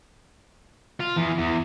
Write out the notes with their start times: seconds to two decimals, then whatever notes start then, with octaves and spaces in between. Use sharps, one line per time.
1.00 F4
1.16 E2
1.38 E2